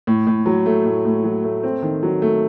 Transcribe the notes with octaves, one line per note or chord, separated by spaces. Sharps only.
A2
A2
F#3
A3
A2
A2
F#3
A3
C4
D#3
F#3
A3